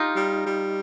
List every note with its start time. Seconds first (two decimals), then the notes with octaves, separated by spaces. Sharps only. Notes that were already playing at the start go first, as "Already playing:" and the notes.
Already playing: D#4 F4 G4
0.15 G3
0.46 G3